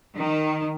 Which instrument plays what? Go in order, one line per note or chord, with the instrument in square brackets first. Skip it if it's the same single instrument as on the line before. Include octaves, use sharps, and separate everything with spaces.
[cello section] D#3